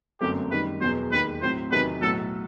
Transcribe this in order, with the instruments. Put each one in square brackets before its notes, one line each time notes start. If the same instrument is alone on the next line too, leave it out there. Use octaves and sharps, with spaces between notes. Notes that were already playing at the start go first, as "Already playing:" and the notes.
[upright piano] G1 F#2 F#3 A3 C4 [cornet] G4
[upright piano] F#2 D#3 G3 [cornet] B4
[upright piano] E1 E2 B2 F#3 [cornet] C5
[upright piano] E1 D#2 D#3 [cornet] B4
[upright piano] A2 F#3 C4 [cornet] C5
[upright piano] E2 C3 D#3 F#3 B3 [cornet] B4
[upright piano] B1 A2 F#3 [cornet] A4